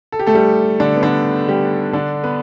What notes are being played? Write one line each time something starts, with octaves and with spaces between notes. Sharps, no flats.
A4
G4
A3 A4
G3 G4
D3 D4
B3
D3 D4
G3 G4
D3 D4
B3 B4